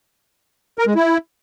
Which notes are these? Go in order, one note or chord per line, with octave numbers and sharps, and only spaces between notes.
A#4
G#3
E4